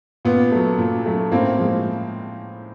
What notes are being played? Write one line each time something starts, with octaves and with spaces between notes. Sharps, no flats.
A#2 B3
F#3 A3
A#2
F#3 A3
A2 A#3 C4
F3 G#3